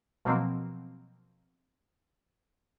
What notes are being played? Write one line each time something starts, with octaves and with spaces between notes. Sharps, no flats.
B2 F3 F#3 A#3 C4